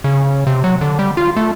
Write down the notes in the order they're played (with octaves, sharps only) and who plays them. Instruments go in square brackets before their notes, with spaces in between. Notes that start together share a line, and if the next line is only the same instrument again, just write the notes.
[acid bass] C#3
C3
F#3
D3
G3
F4
A3